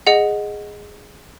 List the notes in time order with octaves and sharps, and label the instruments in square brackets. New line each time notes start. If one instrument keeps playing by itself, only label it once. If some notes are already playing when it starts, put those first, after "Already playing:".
[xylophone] G#4 D#5 F#5